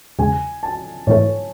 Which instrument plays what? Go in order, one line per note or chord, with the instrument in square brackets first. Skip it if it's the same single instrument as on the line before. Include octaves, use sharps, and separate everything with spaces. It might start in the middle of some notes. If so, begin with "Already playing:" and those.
[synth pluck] E2 C#3 G#3 [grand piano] G#5
[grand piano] A5
[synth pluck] G#2 E3 A3 [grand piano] C#5